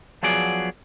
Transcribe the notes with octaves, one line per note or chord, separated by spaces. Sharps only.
F3 F#3 B3 G#4 D5